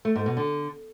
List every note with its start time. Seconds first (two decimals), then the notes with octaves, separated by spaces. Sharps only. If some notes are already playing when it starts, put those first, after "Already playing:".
0.05 A3
0.15 G#2
0.26 B2
0.37 D3